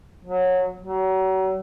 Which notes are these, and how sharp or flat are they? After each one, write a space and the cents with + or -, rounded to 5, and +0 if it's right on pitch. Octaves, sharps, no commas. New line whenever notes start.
F#3 -15
F#3 +35